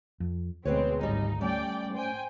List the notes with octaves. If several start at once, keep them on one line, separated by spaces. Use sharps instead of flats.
F2
D2 B2 G#3 B3 C4 B4 C#5
G#1 C#3 G3 D#4
G3 A3 C#4 D5 G5
C5 G5 G#5